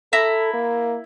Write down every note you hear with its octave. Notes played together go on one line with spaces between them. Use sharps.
E4 A4 A#5
A#3